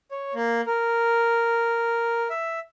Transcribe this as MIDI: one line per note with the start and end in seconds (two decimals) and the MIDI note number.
0.11 0.34 73
0.34 0.61 58
0.66 2.28 70
2.30 2.59 76